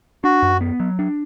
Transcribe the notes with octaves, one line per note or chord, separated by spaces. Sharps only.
D4 F#4
F#2
B3
F#3
D4